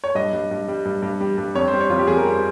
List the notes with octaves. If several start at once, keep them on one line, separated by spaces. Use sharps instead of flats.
C#5
G2 D#5
G2
G2
G3
G2
G2
G3
G2
F2 C#5
C5
G3
C#5
F2 F4
G4
F2 G#4
A#4
G3 C5